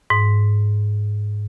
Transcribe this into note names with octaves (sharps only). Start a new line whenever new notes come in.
G#2